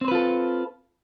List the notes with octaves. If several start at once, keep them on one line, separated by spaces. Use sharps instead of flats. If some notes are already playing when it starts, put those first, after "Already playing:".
C4 F4 A4 B4 C5